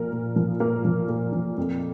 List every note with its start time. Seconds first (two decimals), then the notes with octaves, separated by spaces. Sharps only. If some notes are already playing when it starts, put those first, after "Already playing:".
Already playing: A#2 F3 A#4
0.12 A#2
0.36 F3
0.60 A#2 A#3 A#4
0.85 F3
1.08 A#2
1.32 F3
1.57 F2